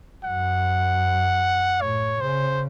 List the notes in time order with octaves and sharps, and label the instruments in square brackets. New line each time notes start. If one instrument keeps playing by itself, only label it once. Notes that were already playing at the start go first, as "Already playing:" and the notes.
[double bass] F#2 [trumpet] F#5
[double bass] A2 [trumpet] C#5
[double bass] C#3 [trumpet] C5